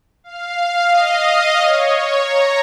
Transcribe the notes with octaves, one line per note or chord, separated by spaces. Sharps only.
F5
D#5
C#5
A#5